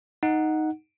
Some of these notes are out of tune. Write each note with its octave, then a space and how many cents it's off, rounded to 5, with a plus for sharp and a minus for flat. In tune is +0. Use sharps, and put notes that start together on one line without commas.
D#4 +0 F#5 +0